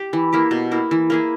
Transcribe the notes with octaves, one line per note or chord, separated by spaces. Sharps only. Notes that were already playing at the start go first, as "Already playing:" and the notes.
Already playing: G4
E3
A#3 E4 G4
B2
A#3 E4
E3
A#3 E4 G#4